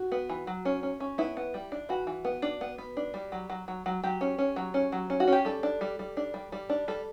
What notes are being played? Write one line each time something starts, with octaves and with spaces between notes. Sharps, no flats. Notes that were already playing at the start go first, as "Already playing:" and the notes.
Already playing: F#4
B3
E3
F#3
C#4
C#4
C#4
B3 E4
B3
G3
D4
E3 F#4
E3
B3
D4
B3
B3
D4
G3
F#3
F#3
F#3
F#3
F#3 G4
C#4
C#4
F#3
C#4
F#3
C#4
F#4
C#4 G4
G3 A4
D4
G3
G3
D4
G3
G3
D4
G3 A4